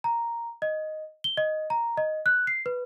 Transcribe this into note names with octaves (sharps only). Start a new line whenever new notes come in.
A#5
D#5
G7
D#5
A#5
D#5
F#6
C7
B4